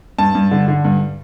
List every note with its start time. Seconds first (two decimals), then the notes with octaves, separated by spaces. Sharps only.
0.18 G2 A5
0.35 G2
0.51 D3
0.68 D3
0.85 G2